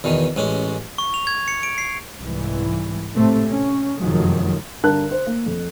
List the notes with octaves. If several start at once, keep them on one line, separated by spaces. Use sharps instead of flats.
E2 B2 D#3
A1 G#3 C#4
C#6
F7
G#6
C#7
D7
C7
C2 G#2 E3
A2 C3 A3 C4
C#4
F1 F#2 D#3 F3 F#3 G#3
G2 D3 A#4 A5 F#6
C5
A#3
F2